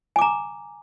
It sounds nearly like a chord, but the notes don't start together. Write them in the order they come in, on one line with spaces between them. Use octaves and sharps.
G#5 D6 A#5